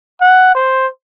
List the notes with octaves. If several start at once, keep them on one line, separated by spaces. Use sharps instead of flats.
F#5
C5